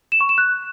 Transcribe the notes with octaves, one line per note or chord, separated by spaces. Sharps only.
E7
C#6
E7
F#6